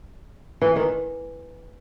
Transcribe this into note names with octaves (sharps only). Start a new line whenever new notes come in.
E3
D#3